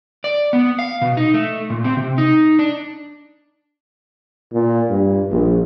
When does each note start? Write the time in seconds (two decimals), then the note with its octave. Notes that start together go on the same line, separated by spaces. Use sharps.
0.24 D5
0.53 B3
0.79 F5
1.01 B2
1.17 D#4
1.34 A3
1.70 A#2
1.84 C4
1.97 C3
2.18 D#4
2.59 D4
4.52 A#2
4.90 G2
5.31 A#1